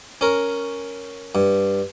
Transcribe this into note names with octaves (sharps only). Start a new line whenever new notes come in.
C#4 A#4
G2